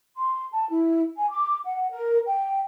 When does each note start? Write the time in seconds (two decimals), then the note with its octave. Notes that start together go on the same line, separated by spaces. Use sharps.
0.17 C6
0.52 A5
0.69 E4
1.17 G#5
1.30 D6
1.65 F#5
1.90 A#4
2.26 G5